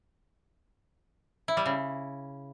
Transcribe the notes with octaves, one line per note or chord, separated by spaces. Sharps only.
E4
G3
C#3